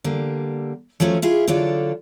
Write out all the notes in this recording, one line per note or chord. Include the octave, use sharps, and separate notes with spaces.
D3 G3 A#3
F3 F#3 A3 C#4
E4 F4 G#4
D3 F#3 F4 A4 D5